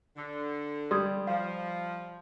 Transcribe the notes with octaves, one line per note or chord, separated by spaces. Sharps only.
D3
G3 C6 D#6 G#6
F3 F5